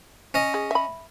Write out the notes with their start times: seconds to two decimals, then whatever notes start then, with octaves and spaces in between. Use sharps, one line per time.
0.34 C#4 D#5
0.54 G#4
0.71 E5 B5